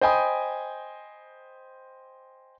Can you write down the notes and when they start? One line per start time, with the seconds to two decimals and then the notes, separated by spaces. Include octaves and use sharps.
0.01 C5 D#5 G5 G#5 B5 D#6